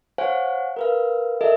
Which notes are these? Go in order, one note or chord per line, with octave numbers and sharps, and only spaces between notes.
C5 C#5 F5 F#5 G#5
A#4 B4 F5
A4 A#4 D#5 E5